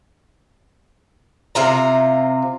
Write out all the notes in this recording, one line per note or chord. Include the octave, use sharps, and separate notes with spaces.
C3 F4 A#5